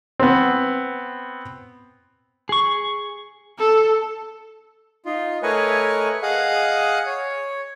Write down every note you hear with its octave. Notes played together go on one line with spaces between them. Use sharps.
B3 C4
G#4 C#6
A4
D#4 F4
A3 A#4 B4 C#5 D#5 G#5
G#4 D#5 F5 F#5
C#5